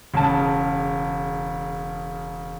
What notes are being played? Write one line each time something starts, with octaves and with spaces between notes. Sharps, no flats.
E1 C#3 A5